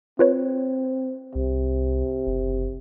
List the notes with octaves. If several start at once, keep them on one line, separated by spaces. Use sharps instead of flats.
C4 F4 B4 C#5
C2 C3
F#1